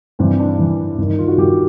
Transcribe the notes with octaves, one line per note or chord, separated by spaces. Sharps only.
G2 E3 C4
D4
G2 E3
G2 D#3
D#4
F4
F#4
G2 D#3 G4